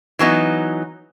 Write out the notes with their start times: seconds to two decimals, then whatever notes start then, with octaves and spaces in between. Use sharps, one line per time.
0.19 E3 F#3 B3 D#4